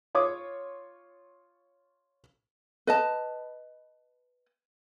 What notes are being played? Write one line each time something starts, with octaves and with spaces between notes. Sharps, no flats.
F4 C#5 D6 D#6
B4 D#5 A5